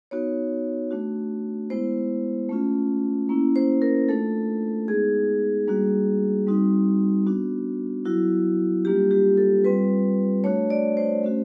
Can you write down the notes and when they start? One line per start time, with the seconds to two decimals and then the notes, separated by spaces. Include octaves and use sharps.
0.11 B3 D#4 F#4 C#5
0.91 A3 D4 F#4
1.70 G#3 B3 E4 C5
2.49 A3 C#4 F4
3.29 A#3 C#4 E4
3.56 C5
3.82 A#4
4.09 A3 D4 F4 A4
4.88 G#3 B3 D#4 G#4
5.67 G3 A#3 D4 F#4
6.47 G3 C4 D#4 F#4
7.26 B3 D4 F#4
8.05 F#3 B3 E4 F#4
8.85 G3 A#3 D4 F4 G4
9.11 G4
9.37 A4
9.64 G3 C4 F4 B4
10.44 A3 D4 F#4 C#5
10.70 D5
10.97 C5
11.23 A3 C#4 F#4